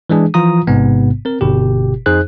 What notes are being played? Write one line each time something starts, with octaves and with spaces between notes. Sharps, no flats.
E3 G#3 D4 G#4
E3 F3 F4 A#5 D#6
A1 G#2 C3 B3
C4 A#4
G1 B2 G4
F2 D#4 G#4 C5 F#6